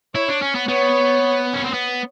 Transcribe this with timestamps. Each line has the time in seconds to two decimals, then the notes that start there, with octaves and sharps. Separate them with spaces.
0.15 E4 C#5
0.28 D4
0.42 C#4
0.55 B3
0.68 B3 C#5
1.54 C#4
1.64 C4
1.74 B3